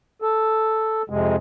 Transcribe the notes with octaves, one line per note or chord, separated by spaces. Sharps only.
A4
F2 C3 G#3